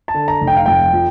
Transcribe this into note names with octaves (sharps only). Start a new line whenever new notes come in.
A5
D3
A#5
F1
G5
F5
F2 G5
F3